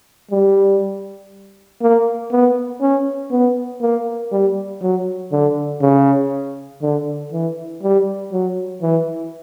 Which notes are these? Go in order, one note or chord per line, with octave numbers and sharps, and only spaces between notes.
G3
A#3
B3
C#4
B3
A#3
G3
F#3
D3
C#3
D3
E3
G3
F#3
E3